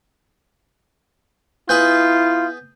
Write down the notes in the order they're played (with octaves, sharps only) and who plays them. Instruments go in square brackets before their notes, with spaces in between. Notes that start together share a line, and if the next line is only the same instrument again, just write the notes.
[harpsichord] B3 G#4 B4 [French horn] E4 [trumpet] F4 [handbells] G6